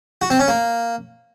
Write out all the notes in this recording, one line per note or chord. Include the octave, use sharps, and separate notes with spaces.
F#4
C4
C#4
A#3